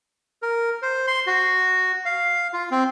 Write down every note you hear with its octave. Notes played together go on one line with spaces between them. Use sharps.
A#4
C5
C6
F#4
F5
F4
C4